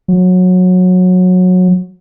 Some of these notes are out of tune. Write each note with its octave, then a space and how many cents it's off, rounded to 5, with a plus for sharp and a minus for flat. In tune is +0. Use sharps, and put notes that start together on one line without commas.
F#3 -20